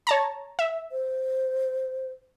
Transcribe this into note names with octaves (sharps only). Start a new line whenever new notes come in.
C#5 A5 A#5
E5
C5